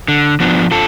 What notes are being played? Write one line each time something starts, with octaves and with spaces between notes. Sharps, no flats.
D3
F3 B3 D4
D3 F4 A4